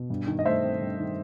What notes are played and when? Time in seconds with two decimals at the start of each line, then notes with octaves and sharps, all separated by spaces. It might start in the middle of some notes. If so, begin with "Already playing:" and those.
Already playing: B2
0.10 G2
0.27 D#3
0.39 D#5
0.45 A3 C5 E5
0.63 C4
0.81 G2
0.99 D#3